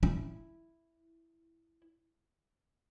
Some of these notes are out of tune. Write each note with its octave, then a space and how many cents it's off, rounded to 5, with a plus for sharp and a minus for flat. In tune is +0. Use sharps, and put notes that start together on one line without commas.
E4 +0